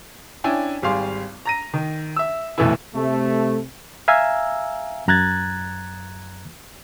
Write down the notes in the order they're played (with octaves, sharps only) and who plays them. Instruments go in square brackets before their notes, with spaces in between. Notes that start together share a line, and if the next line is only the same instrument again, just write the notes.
[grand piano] C#4 D4 E4 G5 G#5
G#1 G3 G#4 F5 C6
A#5 A#6 D#7
D#3
E5 E6
F1 B1 E3 A3 B3 E4
[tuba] C3 [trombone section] A3
[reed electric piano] E5 F5 G#5 A#5 E6
F#2 A#5 F#6 G#6 A6